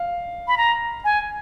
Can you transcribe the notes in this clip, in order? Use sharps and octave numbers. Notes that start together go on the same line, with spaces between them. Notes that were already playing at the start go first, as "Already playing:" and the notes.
Already playing: F5
B5
A#5
G#5